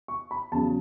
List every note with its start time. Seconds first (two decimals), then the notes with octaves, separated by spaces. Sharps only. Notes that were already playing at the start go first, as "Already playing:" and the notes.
0.08 C#6
0.31 B5
0.52 E2 C#3 F#3 A5